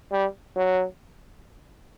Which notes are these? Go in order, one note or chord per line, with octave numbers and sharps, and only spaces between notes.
G3
F#3